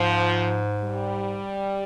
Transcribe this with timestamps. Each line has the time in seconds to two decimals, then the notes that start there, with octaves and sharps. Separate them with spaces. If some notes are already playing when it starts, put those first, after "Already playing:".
Already playing: G#2 F3
0.82 G3